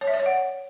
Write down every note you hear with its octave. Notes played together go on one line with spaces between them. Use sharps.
C#5
E5
D5
C#5
F#5